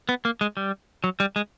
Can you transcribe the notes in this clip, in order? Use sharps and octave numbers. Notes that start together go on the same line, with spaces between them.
B3
A#3
G#3
G3
F#3
G3
G#3